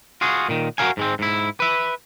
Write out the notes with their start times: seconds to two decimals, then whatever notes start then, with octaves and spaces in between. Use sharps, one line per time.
0.21 F4 F#4 G#4
0.49 A#2 D#3
0.78 F#4 A4 A#4 F5 G#5
0.97 G#2 G#3 C4
1.19 G#2 E4
1.60 B4 E5